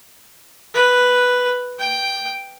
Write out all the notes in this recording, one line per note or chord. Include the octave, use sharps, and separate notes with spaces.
B4
G5